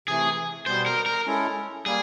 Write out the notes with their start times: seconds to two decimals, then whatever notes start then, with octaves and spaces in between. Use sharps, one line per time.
0.08 C3 E3 A3 G#4
0.66 B2 G3 B3 C5
0.86 A#4
1.06 A#4
1.26 G#3 C#4 E4 A4
1.85 G3 A#3 G#4